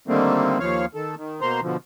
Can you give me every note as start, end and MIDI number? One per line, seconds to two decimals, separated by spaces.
0.08 0.59 50
0.08 0.59 51
0.08 0.59 55
0.08 0.59 57
0.08 0.59 58
0.08 0.59 60
0.59 0.86 39
0.59 0.86 53
0.59 0.86 73
0.59 0.86 77
0.95 1.15 51
0.95 1.15 69
1.17 1.41 51
1.41 1.60 47
1.41 1.60 58
1.41 1.60 72
1.41 1.60 82
1.41 1.60 84
1.62 1.77 47
1.62 1.77 50
1.62 1.77 53